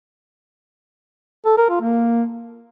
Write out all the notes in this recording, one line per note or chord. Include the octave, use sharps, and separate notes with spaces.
A4
A#4
F4
A#3